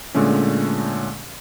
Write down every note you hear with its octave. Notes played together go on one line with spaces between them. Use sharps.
A#2 D3 G#3 A3 C#4